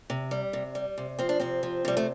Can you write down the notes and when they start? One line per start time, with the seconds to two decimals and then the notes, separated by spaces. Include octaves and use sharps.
0.10 C3
0.31 G3
0.53 C3
0.75 G3
0.98 C3
1.19 F3 C4
1.29 D4
1.40 C3 C4
1.63 F3
1.85 C3 G3
1.97 A3